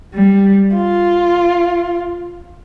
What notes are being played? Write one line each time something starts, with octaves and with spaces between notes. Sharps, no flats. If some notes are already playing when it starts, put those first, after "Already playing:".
G3
F4